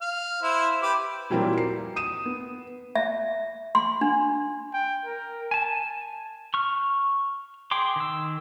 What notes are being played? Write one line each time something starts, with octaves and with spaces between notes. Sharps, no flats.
F5
E4 C5 E5
G4 B4 D6
A#2 E3 F#3 G3 A#3 C4
C7
D#6 D#7 E7
B3
E5
C6
D4
G5
A#4
G#5 A5
C#6 F6
G#4 G5 C6 D6
D#3 E6